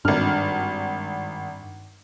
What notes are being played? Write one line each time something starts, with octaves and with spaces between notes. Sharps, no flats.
G#1 G2 D4 F6